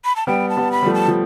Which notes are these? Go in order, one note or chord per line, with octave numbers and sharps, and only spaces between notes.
B5
A5
G3 B3 G5
A5
G3 B3
B5
G3
F3 A3
A5
F3